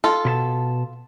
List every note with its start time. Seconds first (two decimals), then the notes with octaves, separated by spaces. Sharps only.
0.04 F4 A4
0.25 B2 B4 A5